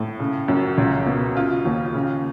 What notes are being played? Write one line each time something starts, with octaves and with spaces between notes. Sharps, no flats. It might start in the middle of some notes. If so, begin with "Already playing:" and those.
Already playing: A2
C#3
F#2
C#2
B2
C#3 F4
D#2
C#3